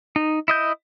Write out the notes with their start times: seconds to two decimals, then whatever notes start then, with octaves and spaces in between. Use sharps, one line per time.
0.16 D#4
0.48 E4 D#5 G6